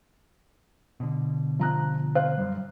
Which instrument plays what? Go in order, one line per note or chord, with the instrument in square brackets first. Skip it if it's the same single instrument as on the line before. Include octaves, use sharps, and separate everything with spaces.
[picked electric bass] B2 D3
[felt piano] F3 A#5 F#6
C5 F5 F#6
[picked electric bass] F#2 G3